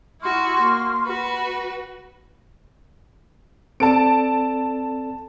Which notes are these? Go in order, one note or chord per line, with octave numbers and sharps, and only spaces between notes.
E4 F#4 C6 C#6 F6
A#3
F#4 B4 B5
C4 A4 D5 A5 D7